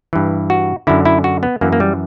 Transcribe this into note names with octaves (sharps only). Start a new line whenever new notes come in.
G2 E3
F#4
F#2 D3 E4
E4
F#4
B3
F#2 E3 A#3
A#3
G3